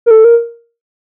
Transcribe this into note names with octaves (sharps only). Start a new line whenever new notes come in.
A#4
A4
A#4